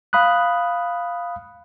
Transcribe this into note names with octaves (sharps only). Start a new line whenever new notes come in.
F5 B5 D#6 F#6